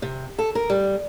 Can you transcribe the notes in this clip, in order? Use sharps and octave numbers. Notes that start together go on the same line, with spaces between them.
C3
A4
A#4
G3